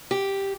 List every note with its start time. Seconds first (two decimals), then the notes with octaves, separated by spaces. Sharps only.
0.11 G4